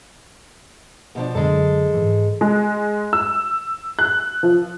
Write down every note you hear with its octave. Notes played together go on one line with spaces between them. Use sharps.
B2 F3 D4
F#2 D3 G#3 A4
G#2 E3
G#3
E6
F#6
F3